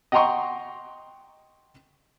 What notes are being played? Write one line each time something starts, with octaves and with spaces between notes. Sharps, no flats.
D#5 F#5 G5 A#5 C6 C#6